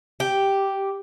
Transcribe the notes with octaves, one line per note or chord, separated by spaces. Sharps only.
G4